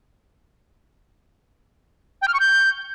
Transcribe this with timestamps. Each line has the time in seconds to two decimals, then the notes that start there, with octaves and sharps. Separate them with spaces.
2.22 G5
2.28 F6
2.34 C#6
2.40 G6